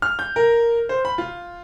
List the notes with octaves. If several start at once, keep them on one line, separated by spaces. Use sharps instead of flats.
F6
G6
A#4
C5
B5
F4